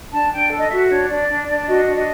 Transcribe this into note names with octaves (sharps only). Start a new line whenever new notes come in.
D4 A5
D4 G5
A4
D#5
F#4 E5
D4 C#5
D4 D5
D4
D4
D5
F#4 D#5
D4
D#5